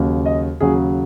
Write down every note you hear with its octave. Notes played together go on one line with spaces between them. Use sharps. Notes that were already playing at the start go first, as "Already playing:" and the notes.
Already playing: D#2 C#3 F#3
D#5
D#2 C#3 F#3 G#4